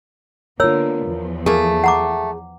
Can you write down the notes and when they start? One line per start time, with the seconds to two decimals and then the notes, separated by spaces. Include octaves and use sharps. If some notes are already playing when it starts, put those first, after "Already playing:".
0.60 D3 A#3 B3 F4 A#4 C#5 E6
1.06 E2 F3
1.46 A3 A#3 G#4
1.84 F#5 A#5 D6